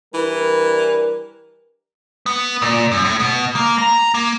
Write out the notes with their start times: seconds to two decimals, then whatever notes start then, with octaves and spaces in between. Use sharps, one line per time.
0.14 E3 G3 D4 A#4
2.26 B3
2.62 A#2
2.92 F#2
3.04 A2
3.20 B2
3.56 A#3
3.78 A#5
4.14 A#3